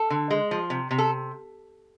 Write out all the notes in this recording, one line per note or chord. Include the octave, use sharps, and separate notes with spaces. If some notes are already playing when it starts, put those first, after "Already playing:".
Already playing: A4
D3
G#3
F3
C3
C3
A4